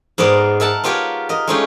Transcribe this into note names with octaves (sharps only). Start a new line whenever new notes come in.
G#2 B3 G#4 A#4 D5 C6
A#4 E5 F#5 A5
B3 F4 G4 A#4 C#5
A#4 D#5
G#3 A3 C#4 D#4 F4 G4